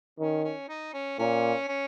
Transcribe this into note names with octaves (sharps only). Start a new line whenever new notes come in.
D#3 C#4
C#4
D#4
C#4
A#2 C#4
C#4